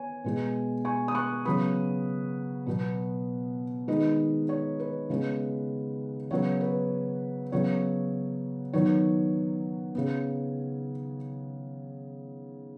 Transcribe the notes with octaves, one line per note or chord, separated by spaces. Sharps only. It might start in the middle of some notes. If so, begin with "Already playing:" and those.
Already playing: B3 C#5 G#5
B2 G#3 B3
G#5 C#6
D#6
C#6 F#6
C#3 F#3 B3 B5 D#6
B2 F#3 B3
D#3 G#3 B3 B4 D#5
C#5
B4
C#3 G#3 B3
C#3 F#3 B3 C#5
B4
C#3 F#3 B3 C#5
D#3 F#3 B3 C#5
C#3 B3